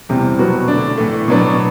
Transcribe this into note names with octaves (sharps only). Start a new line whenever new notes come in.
E2 C3 E3 G3 C4
B2 F#3 B3 F#4
D3 A3 D4
A2 E3 A3
B2 F#3 B3 D4